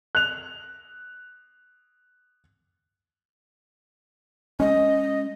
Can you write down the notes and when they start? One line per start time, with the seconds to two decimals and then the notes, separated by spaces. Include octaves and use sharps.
0.15 F#6 F7
4.60 G#3 C#4 D#5